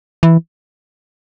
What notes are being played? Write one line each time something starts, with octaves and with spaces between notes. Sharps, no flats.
E3